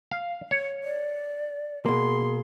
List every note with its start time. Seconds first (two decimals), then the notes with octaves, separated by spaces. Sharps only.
0.11 F5
0.51 C#5
0.84 D5
1.86 B2 A#3 G#4 C6